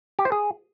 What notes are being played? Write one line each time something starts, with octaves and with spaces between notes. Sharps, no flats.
G4
C5
G#4